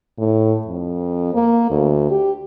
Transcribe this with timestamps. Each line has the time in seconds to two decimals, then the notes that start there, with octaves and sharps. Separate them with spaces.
0.18 A2
0.67 F2
1.34 A#3
1.70 D2
2.11 G4